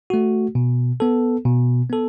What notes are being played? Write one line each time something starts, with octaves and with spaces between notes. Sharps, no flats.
A3 F#4
B2
B3 A4
B2
B3 A4